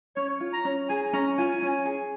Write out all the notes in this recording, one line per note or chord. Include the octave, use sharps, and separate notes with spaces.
C#4 C#5
F4
A#5
C#4
G#4 G#5
C#4 A#5
F4 G#5
C#4
G#4